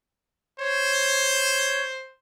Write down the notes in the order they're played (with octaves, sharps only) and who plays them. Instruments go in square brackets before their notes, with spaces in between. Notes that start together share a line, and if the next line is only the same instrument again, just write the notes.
[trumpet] C5 [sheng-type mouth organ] C#5